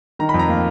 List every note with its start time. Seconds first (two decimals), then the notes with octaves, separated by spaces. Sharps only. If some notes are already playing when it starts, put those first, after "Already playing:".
0.19 D#3 A#5
0.29 F2 B5
0.39 A#5
0.49 A#3